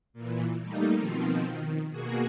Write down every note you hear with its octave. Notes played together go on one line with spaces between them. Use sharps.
A#2 E3
G3 A3 A#3 D#4
B2 D#3 F3 C4
D#3
B2 A#3 F#4 G#4